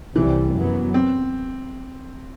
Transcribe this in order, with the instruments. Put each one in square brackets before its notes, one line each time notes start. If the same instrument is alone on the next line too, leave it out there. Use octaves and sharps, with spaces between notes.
[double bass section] C2 C3 G3 [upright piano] E3
[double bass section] F#2 F#3 B3
[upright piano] C4